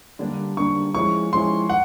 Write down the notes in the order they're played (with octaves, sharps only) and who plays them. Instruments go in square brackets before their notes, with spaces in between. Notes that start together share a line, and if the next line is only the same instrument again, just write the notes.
[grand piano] D3 G3 A#3 D4
[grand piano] D3 G3 A#3 D4 [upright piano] C#6
[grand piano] F3 G#3 C#4 E4 [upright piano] C#6
[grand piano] F3 G#3 C#4 E4 [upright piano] C6
[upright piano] F#5